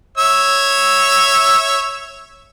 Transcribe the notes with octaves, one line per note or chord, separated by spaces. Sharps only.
C#5 E5 E6